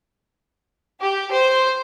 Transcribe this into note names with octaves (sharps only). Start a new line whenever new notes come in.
G4
C5